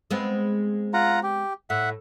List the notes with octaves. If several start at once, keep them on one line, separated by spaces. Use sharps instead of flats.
G#3 B3 C4
F4 F#5 A#5
G4
A2 E5 F#5